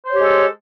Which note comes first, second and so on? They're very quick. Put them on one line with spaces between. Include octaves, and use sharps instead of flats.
C5 C#5 G4 G#3 A4